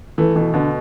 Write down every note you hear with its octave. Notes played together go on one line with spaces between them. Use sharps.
E3 A3
B2 E3
B2 D3